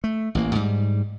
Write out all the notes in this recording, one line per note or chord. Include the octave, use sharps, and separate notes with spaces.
A3
A1 E3 A#3
G#2 G3